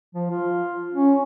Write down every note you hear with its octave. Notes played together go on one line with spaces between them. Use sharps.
F3
F4
C#4